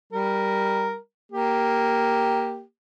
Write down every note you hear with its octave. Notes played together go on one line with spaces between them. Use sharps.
G3 A#4
A#3 G4